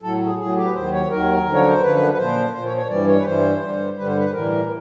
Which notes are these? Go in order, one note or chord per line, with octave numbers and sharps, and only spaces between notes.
A2 F#3 A4
G#4
A2 F#3 G#4
G4
B4
D#2 D#3 F#3 C5
C#5
D#2 D#3 F#3 A#4
F#2 D3 F3
C#5
C5
F#2 D3 F3 B4
B4
A#2 F3 C5
A#2 F3 C5
C#5
C#5
G2 E3 G3 D5
C#5
B4
G2 E3 G3 C5
G2 D3 G3
G2 D3 G3 B4
C5
B4
A2 E3 G3 A#4